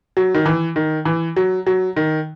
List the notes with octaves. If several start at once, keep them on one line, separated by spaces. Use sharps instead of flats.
F#3
D#3
E3
D#3
E3
F#3
F#3
D#3